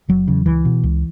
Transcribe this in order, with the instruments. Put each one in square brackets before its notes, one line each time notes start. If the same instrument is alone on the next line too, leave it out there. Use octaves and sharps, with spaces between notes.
[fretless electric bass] F#1 F#3
E2 C#3
C#2 E3
B2
C#2